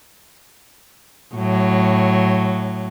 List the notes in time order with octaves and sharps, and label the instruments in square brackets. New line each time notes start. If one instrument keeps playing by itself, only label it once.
[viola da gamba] A2 F#3